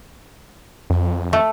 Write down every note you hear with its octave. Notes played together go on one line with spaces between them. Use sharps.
F2
A3